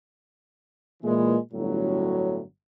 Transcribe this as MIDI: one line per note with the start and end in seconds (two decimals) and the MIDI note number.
1.03 1.35 46
1.03 1.35 52
1.03 1.35 56
1.52 2.41 31
1.52 2.41 45
1.52 2.41 54